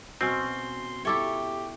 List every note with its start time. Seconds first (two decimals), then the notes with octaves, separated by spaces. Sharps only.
0.21 B2 C4 C#4 C6
1.05 E4 G4 A4 C#5 E5 D6